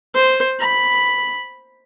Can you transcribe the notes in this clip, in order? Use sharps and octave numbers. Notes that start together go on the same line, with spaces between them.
C5
B5